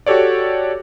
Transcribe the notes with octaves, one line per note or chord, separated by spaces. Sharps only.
F#4 G4 A4 C#5 D5